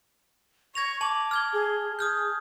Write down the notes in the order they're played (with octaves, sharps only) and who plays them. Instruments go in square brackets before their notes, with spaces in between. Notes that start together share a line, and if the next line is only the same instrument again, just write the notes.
[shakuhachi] C#6 [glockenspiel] G#6 A#6 F7
[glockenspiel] A5 F#7 [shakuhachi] D6
[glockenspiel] F6 G#6 G7
[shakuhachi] G#4
[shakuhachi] G#4 [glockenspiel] D#6 F6 G6